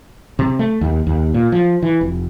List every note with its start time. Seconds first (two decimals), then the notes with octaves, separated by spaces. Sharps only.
0.39 C3
0.59 A3
0.81 D#2
1.07 D#2
1.34 A#2
1.52 F3
1.82 E3
2.01 F1